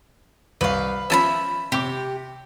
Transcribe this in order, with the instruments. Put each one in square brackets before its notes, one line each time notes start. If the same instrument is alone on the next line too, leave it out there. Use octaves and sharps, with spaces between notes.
[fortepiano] C2 [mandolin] B4 F5
[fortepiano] F3 C#4 [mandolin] E5 A5 B5
[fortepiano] C3 D6 [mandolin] G4